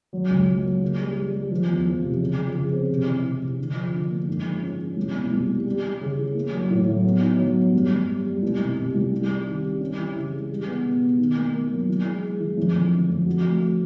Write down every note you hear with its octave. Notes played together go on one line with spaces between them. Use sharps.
F#3
C#2
F#3
A#3
C#3
G3
G3
G3
F3
E2
F3
C3
C#3
F3
C#3
C4
C3
E3
C3
C3
D3
F3
D3
A#3
G#2
F3
C#4
C#4
C2
B2
C2
G3
G3
G3
C#3
E3
A#3
F#3
A2
F#3
B3
D#4
F#3
B3
G2
G2
G3
G3
C2
C3
C3
C2
G3
G3
D#3
G3
C#4
E3
C#3
G#3
G3
B3
B2
B2
D#3
A#3
A#3
F#3
E3
G#3
G#3
E3
F2
F2
D3
F2
F#4
A3
A3